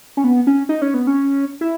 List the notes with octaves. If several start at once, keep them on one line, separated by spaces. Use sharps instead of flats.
C#4
B3
C#4
D#4
C#4
B3
C#4
E4